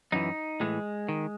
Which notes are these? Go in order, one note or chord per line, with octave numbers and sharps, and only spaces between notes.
F#2 E3 D#4
A2 E3 G#3
D#3